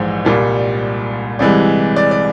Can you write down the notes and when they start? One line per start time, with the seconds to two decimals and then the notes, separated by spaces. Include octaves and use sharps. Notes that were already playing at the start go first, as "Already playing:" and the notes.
Already playing: A#1 G#2 E3 G#3 C5
0.25 C2 A#2 G3
1.39 C2 C3 E3 G#3 D5
1.96 D5
2.11 D5